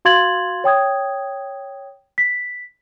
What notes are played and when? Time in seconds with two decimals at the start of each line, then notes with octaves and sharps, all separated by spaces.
0.05 F#4 F5 C6 G#6 A6 F#7
0.64 C#5 G5 D#6 G#6
2.18 B6